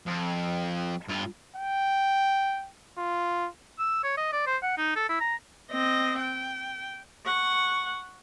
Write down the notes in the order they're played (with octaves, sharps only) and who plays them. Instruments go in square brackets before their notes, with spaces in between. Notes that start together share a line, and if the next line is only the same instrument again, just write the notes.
[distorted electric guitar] F2
G2 F4
[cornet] G5
F4
[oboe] E6
C#5
D#5
D5
C5
F#5
D#4
A4
E4
A#5
[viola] C4 D#5
G5
F#5 C#6